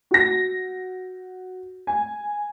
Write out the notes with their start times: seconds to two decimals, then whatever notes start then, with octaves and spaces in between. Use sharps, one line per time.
0.11 F#4 A#6
1.87 G#5